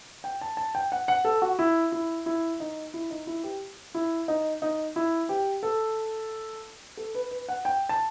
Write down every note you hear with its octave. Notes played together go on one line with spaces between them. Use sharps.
G5
A5
A5
G5
F#5
F#5
A4
F#4
E4
E4
E4
D#4
E4
D#4
E4
G4
E4
D#4
D#4
E4
G4
A4
A4
B4
B4
F#5
G5
A5